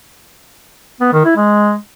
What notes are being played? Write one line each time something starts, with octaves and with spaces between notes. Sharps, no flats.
B3
D#3
E4
G#3